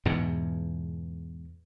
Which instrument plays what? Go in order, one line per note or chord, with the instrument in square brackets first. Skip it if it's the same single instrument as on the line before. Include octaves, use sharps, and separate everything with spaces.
[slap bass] E2 G#2 B2